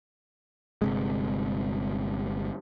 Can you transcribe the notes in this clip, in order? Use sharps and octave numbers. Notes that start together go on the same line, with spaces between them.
G1 C3 G#3